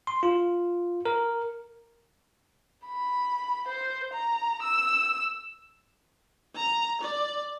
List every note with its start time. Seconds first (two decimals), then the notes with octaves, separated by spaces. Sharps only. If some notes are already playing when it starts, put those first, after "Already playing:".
0.07 C6
0.23 F4
1.05 A#4
2.86 B5
3.68 C5
4.14 A#5
4.62 E6
6.56 A#5
7.01 D5